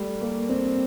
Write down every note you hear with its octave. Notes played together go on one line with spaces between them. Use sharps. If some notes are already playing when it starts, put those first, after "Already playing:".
Already playing: G3 A3
A#3
C4